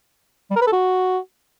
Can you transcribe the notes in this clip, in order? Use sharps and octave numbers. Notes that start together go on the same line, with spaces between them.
G3
A#4
B4
A4
F#4